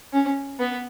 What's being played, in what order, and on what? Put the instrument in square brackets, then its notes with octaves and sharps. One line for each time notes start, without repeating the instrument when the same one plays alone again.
[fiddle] C#4
B3